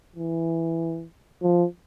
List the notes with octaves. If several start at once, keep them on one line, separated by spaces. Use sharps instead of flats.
E3
F3